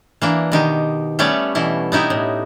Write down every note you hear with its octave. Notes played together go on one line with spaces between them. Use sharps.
E3 A#3 D4
B2 D#3 G4
G3 A3 B3 C#4 C#5 D5
B2 E3 E4
B3 D#4 E4 G4
A2